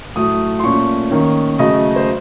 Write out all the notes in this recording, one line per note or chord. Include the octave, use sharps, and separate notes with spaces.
A2 F#3 A3 D#6
C6
A#2 A3 C#4 C#6
D#3 A#3 C#4
C#3 F#3 A3 D#5
C5